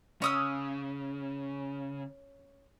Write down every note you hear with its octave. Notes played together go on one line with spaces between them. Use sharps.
C#3 C#4 D#6 E6